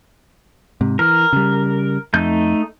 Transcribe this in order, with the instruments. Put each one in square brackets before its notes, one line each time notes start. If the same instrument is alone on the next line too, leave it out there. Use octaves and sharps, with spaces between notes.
[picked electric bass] G#2 C3
[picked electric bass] E3 [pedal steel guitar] A#4
[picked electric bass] C#3 G3
[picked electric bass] F2 [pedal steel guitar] A3 D#4 G6